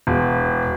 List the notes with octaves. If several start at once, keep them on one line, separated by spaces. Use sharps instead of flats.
E1